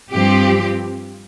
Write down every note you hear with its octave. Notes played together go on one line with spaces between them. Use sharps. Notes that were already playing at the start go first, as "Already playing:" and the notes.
G2 F3 C4 G4